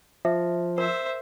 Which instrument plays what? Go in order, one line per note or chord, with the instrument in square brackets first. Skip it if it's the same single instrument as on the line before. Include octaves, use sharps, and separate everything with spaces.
[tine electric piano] F3 [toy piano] E5
[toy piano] A#4 [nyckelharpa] C5 E5